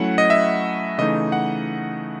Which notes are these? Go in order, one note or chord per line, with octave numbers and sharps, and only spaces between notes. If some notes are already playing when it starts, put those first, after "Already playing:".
Already playing: F#3 A3 C#4 E4 F#5
D#5
E5
C#3 E3 A3 D#4 D#5
F#5